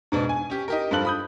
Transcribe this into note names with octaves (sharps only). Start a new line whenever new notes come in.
G#2 B2 D4
G#5
C#4 G4
D#4 G4 A#4
G2 F3 F4 A4 F#6 F#7
B5 D#6 G6